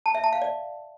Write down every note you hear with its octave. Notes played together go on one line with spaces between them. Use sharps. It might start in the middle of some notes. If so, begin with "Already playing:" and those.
A5
E5
A5
F5
D5